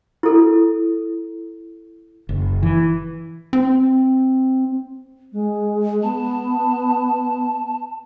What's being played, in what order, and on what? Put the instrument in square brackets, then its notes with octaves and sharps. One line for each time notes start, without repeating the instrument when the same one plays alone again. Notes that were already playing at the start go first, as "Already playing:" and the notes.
[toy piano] E4 A4
[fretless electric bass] F#1
E3
[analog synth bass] C4
[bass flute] G#3
[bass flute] B3 [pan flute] A5